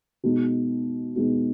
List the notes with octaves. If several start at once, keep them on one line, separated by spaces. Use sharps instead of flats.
B2 G#3 B3 D#4 F#4
B2 G#3 B3 D#4 F#4